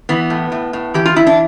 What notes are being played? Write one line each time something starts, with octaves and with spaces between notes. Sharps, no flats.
E3 B3
A2
A2
A2
E3 G4
F4
E3 E4
D4